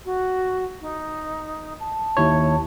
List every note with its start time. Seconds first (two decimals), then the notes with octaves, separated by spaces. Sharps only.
0.05 F#4
0.81 D#4
1.80 A5
2.17 D#2 E4 C#5